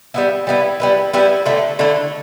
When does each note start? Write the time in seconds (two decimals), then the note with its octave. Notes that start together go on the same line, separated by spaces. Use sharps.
0.14 G3 B3 E4
0.47 G3 B3 E4
0.80 G3 B3 E4
1.13 G3 B3 E4
1.46 D3 A3 E4
1.79 D3 A3 E4